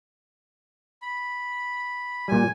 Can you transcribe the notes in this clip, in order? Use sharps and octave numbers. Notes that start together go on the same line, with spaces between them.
B5
A#2 G3 G#5